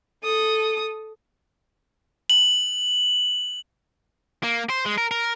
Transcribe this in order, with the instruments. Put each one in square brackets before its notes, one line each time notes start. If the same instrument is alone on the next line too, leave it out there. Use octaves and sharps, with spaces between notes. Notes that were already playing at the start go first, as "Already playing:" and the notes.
[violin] A4 D#6
[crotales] F#7
[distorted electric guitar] A#3
C5
G#3
A#4
A#4